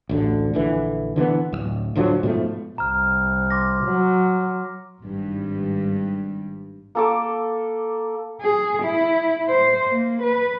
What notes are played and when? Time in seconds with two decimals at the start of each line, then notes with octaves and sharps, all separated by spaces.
0.09 A1 D2 D3
0.53 A#1 D3 E3
1.16 D3 E3 G3 B3
1.53 D1 F#2
1.95 D1 D3 F3 F#3
2.23 G#2 B2 F3 A3
2.78 C2 A#5 F6
3.50 C6 D6 A#6
3.84 F#3
5.00 G#1 G2
6.95 A#3 A4 D6
8.41 G#4
8.83 E4
9.48 C5
9.92 A#3
10.23 B4